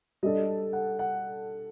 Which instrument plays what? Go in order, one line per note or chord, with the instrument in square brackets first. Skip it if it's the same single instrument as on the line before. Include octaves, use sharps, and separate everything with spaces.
[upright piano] G3 D4 A4 [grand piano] D#5
[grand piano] F#5
F#5